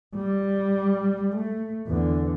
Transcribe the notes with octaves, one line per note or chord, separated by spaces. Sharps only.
G3
A3
E2 D3